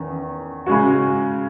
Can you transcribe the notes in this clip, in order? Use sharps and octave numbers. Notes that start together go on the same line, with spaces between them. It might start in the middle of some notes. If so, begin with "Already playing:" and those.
Already playing: E2 D#3 C#4
C#3 G#3 C#4 F#4